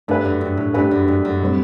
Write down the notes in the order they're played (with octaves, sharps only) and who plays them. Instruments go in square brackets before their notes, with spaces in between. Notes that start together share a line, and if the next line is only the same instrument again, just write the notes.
[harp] G2 [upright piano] A3 D4 G4 B4
[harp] F#2
G2
A2
[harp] G2 [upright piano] A3 D4 G4 B4
[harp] F#2
G2
F#2
[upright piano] A2 G3 C4